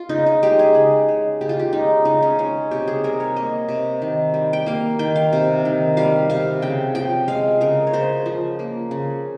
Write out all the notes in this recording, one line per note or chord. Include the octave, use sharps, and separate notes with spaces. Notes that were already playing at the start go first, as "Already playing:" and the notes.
Already playing: F4
C#3 D#4
D#4
G#3 G4
G#4
C#3
G#3
C#3 G4
F4
G4
G#3 D#4
C#3 D#4
C#4
G#3 C#4
C3 G4
G#4
G3 A#4
C#5
A#3 D#5
C3
D#3
G3
G5
A#3 F5
D#3 G5
F5
C3
D#3
G3 F5
C3 F5
C#3 G5
F3 G5
G#3 F5
C#3 A#4
C#5
C#3 C5
F3
A#3
C#3